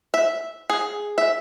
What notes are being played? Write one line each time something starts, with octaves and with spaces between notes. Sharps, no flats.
E5
G#4
E5